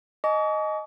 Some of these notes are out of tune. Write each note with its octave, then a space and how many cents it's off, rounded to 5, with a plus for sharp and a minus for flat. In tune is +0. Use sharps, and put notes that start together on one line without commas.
D#5 +0 G#5 +40 C#6 +45